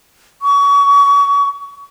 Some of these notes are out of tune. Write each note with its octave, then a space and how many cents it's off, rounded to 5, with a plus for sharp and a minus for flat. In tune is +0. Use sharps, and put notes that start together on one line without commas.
C#6 +30